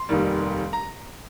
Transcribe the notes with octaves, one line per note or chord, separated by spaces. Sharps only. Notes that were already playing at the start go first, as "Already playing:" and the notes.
Already playing: C6
F1 D#2 D#3 G3
A#5